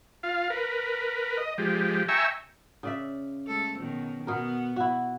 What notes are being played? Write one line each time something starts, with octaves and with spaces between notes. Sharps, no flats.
F4 F5
A#4 B4
D#5
F3 G#3 G4
E5 G5 G#5 A#5 C#6 E6
C#3 D5 E5
G#3 A3 A4
B2 D#3 F#3
B2 B3 A#4
E4 F#4